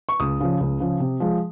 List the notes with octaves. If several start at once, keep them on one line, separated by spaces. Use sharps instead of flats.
C#6
C#2 D#6
C#3 F3
C#2
C#3 F3
C3
F3 G#3